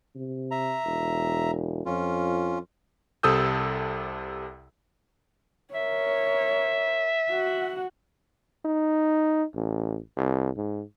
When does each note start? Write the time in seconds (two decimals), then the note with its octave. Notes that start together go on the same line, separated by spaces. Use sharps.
0.16 C3
0.51 E5 A#5
0.85 E1
1.86 F2 C#4 F4
3.23 C2 C3 A4 D#6 E6 G6
5.74 A#4 C#5 E5
7.30 F#4 F#5
8.65 D#4
9.56 A1
10.17 C2
10.57 G#2